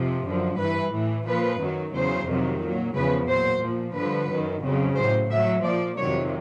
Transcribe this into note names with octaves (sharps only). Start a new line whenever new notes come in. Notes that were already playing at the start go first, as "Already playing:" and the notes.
Already playing: F2 C3 F3
F#2 D3 F3
G2 E3 B4
A2 E3
A#2 F3 B4
F#2 D#3 F#3
E2 C#3 F#3 C5
F2 C3 D#3 F#3
A#2 F#3
E2 C#3 F3 B4
A#2 F#3 C5
A#2 F3
G2 D3 F3 B4
F#2 D#3 F#3
F2 C#3 F#3
A2 F#3 C5
A2 F#3 E5
A#2 F3 D5
F2 C3 D#3 F#3 C#5